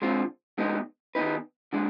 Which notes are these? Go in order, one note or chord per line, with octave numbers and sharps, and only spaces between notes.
D3 G#3 C4 F4 C5
D2 D3 G#3 B3 D#4
D#3 B3 D#4 B4
D3 G#3 D4